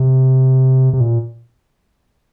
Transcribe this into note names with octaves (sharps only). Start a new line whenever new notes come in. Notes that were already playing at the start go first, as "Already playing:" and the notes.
Already playing: C3
C3
A#2